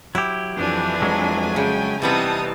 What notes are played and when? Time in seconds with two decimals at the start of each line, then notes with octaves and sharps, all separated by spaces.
0.15 F#3 E4 G4
0.56 F2 E3 A3 D4 B4 G#5
1.02 F#3 G#3
1.56 C#3 G5
2.02 C3 E3 G3 B3 C4 D#4 A5 D#6